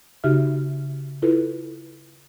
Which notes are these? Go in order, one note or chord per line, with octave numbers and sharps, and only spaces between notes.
C#3 D#4 F#4 G4 E5 F6
E4 F4 A4 B4